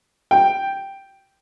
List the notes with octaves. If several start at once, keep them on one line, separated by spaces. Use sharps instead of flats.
G5